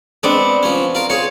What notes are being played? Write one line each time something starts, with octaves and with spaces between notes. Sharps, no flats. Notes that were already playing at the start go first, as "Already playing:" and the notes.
G#3 B3 C4 D4
F3 C#4
F4 A#4
F4 G#4 C#5